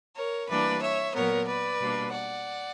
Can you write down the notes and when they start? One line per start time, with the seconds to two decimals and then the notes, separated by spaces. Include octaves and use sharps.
0.16 A#4 C#5
0.49 E3 G3 A#3 D4 B4 D5
0.81 C#5 E5
1.14 A#2 F#3 B3 A#4 C#5
1.47 B4 D5
1.79 B2 G3 A#3 D4
2.12 D5 F#5